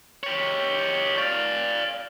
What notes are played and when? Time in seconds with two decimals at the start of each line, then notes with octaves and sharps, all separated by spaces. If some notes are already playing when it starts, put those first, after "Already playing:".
0.23 G4 C#5
1.18 D5 F5